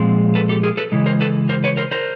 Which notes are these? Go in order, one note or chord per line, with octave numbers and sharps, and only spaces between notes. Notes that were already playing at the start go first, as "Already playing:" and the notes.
Already playing: A#2 F3 G#3 C4
A4 B4
G4 A4
G#4 A#4
A4 B4
C#3 E3 G#3
A#4 C5
A4 B4
A#4 C5
B4 C#5
A#4 C5
A#4 C5